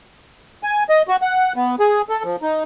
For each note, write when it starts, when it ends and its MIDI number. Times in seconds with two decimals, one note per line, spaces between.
0.63 0.83 80
0.89 1.02 75
1.08 1.16 66
1.22 1.53 78
1.56 1.75 59
1.80 2.02 68
2.09 2.23 69
2.24 2.36 53
2.42 2.63 63